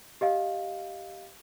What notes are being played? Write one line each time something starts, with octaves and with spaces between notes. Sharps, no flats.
G4 D#5 F5